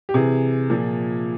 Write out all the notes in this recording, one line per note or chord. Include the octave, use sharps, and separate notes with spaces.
G4
C3 E3 G#4
A#2 F3